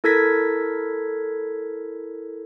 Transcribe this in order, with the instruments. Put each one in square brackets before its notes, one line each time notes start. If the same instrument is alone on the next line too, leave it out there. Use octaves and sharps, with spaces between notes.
[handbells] E4 A4 A#4 G#6 A#6 B6